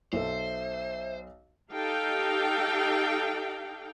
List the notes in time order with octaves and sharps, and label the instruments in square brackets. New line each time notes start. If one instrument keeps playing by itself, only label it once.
[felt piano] B1 A4 [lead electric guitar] C5 [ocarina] E5
[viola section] D#4 G4 A4 F5 G5